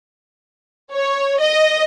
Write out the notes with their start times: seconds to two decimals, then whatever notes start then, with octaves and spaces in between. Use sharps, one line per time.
0.94 C#5
1.41 D#5